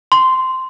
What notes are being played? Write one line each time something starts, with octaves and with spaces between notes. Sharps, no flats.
C6